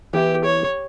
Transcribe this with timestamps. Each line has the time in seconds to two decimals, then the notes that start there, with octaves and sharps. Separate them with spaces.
0.13 E3 B3 E4 G4
0.45 C#5